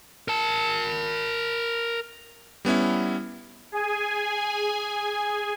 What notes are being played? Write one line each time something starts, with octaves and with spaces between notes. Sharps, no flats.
A#4 A5
G3 B3 C#4 E4
G#4 G#5